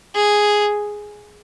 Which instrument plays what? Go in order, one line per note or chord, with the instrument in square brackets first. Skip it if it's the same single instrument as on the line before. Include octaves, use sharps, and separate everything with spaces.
[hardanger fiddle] G#4